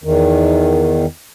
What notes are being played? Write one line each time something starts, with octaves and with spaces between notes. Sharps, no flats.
E2 D#3